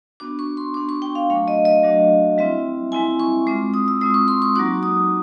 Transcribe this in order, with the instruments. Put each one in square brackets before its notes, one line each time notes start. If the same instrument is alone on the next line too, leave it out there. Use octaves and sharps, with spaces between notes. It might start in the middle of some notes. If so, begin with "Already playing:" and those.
[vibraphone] B3 D4 F#4 D6
C#6
C6
B3 D4 F#4 D6
C#6
G5
F5
F#3 A3 D4 F#4 F5
D#5
D#5
F#3 A3 D4 F#4
G3 C4 E4 E5
G3 C4 E4 G#5
C#6
G#3 C4 F4 D6
D#6
E6
G#3 C4 F4 D#6
C#6
C6
C#6
F#3 A#3 D#4 F#4 D6
D#6